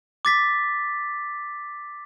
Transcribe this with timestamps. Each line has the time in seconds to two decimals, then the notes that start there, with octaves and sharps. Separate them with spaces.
0.25 D6 A6 B6